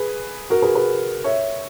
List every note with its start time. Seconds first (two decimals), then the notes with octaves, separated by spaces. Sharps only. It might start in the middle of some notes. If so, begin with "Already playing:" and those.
Already playing: G#4 B4
0.50 F#4 A#4
0.62 G#4 B4
0.75 G#4 B4
1.24 C#5 E5